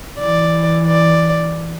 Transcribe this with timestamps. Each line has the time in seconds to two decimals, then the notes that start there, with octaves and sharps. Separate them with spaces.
0.19 E3 D5
0.86 D5